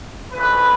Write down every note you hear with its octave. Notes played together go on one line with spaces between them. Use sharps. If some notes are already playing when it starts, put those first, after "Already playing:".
F2 C#3 E3 B4